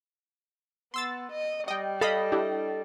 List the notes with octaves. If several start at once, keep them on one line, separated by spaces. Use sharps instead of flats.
B3 C6 E6 A6
D#5
G3 D#5 G5
A4 D#5 F5 B5 D#6
D4 E4 G4